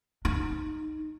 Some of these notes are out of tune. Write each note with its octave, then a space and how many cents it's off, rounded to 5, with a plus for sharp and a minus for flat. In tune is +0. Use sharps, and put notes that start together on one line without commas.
D#4 -10